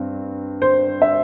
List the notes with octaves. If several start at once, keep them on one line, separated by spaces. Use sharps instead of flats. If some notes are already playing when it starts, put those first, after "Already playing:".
Already playing: G2 C4
C5
E5